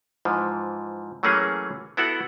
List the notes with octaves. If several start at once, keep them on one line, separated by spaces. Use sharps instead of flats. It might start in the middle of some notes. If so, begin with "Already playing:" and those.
G#2 E3 F3
E3 F#3 A3 A#3 C#4 G#4
B3 E4 F#4 A4 F#5